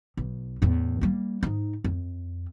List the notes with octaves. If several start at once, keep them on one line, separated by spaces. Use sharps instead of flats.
B1
E2 A2
G3 A#3
G#2 D#4
F2